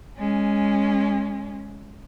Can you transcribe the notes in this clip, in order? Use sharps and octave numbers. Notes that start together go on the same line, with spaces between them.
G#3 C#4